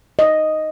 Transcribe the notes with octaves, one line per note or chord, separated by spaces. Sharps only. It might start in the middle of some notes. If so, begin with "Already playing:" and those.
D#5